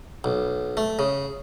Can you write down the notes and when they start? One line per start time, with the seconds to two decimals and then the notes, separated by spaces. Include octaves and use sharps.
0.24 B1
0.77 A3
0.99 C#3